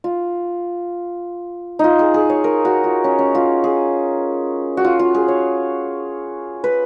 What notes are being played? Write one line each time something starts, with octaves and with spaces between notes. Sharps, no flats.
F4
D#4 F4
G#4
G#4
C#5
A#4
F#4
F4
C#4
C#4
F4
G#4
F#4
F4
F4
G#4
C#5
B4